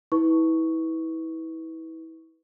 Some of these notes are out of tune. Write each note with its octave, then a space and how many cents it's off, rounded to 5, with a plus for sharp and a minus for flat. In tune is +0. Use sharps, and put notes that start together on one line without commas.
E4 -35 B4 +0 C#6 +0